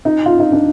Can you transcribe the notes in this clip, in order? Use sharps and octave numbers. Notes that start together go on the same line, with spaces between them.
D#4
F4
D#4
D4